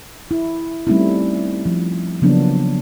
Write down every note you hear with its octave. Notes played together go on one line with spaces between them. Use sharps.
E4
G3 A3 C4 C#4 D#4 E4
F3
C#3 F3 F#3 A#3 B3 D4